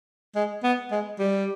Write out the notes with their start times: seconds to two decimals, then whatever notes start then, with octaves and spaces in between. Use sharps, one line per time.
0.35 G#3
0.63 B3
0.91 G#3
1.19 G3